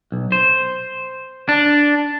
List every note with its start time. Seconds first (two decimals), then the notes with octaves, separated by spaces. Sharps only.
0.12 B1
0.32 C5
1.49 D4